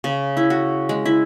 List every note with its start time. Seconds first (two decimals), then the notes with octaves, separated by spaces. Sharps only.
0.04 C#3
0.37 E4
0.50 F#4
0.89 G#3
1.05 E4